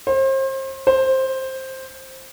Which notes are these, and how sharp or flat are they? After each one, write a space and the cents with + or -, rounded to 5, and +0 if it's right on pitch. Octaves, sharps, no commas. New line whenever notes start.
C5 +35
C5 +10